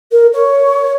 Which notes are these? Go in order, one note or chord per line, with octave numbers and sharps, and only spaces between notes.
A#4
C#5